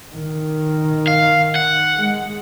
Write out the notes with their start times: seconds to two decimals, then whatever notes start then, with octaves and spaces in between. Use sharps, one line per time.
0.12 D#3
1.07 F5
1.55 F#5
1.99 G#3